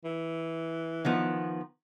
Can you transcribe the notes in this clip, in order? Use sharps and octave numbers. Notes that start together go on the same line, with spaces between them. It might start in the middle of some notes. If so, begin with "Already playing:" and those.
E3
D#3 F3 B3